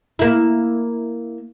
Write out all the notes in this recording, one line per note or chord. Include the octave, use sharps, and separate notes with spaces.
A#3 E4